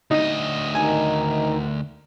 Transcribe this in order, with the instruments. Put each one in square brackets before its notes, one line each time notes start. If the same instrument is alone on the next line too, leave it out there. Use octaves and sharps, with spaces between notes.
[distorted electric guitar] D2 D#5 [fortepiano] D#4
[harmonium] D#3 D#4 [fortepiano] G#5